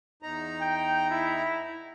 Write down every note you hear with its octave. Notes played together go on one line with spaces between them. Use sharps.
E2 D#4 A#5
G5
E4